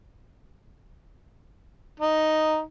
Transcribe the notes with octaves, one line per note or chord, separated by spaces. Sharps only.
D#4